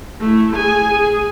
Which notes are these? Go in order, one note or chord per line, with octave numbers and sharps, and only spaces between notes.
A3 E4
G#4 G#5
G#4